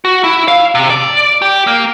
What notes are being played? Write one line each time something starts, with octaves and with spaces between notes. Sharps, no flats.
F#4
E4
F5
C3
D5
G4
A#3